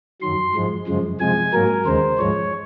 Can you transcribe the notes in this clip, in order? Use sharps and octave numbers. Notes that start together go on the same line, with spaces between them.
F#2 D#3 F#3 C6
G#2 F3 G#3
F#2 C#3 F3 G#3
C3 F3 G#3 G#5
G#2 F#3 A#3 A#4
D#2 C#3 G#3 C5
G#2 F3 G#3 C#5